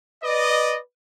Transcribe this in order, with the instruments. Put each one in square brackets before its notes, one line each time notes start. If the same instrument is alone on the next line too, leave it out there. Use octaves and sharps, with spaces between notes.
[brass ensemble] B4 D5 D#5